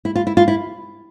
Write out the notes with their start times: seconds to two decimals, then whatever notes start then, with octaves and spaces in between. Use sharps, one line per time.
0.05 E4
0.16 F4
0.27 E4
0.37 F4
0.48 E4